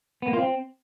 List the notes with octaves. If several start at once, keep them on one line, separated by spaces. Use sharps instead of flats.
B3
A#3
F4
C4